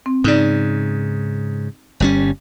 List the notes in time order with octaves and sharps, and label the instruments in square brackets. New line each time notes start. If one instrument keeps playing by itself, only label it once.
[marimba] C4
[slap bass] G#2 C#3 [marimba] D#4 D5
[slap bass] G1 G3 C#4